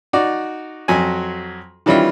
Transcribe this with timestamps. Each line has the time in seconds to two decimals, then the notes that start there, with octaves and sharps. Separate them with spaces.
0.13 D#4 F#4 D5
0.88 F2 F#3 G#5
1.86 D#3 E3 G3 C#4 E4 F4